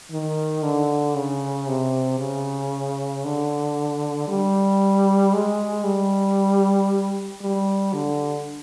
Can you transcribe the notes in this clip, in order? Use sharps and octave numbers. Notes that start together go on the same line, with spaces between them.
D#3
D3
C#3
C3
C#3
D3
G3
G#3
G3
G3
D3